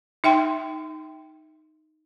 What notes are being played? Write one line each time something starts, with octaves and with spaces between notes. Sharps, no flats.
D#4 E5 G5 C6